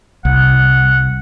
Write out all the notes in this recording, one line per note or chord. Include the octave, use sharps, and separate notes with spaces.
C2 F#5